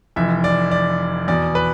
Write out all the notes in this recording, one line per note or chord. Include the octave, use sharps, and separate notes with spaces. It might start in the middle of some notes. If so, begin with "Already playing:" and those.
F1 F2 E3 E5
D5
D5
E2 B2 D5
B4